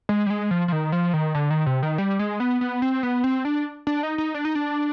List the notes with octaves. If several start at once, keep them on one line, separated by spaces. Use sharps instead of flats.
G#3
G3
G#3
F3
F3
D#3
F3
D#3
D3
D#3
C3
D#3
G3
G#3
B3
B3
C4
B3
C4
D4
D4
D#4
D#4
D4
D#4
D4